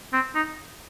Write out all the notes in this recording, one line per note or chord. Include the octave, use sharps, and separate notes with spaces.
C4
D#4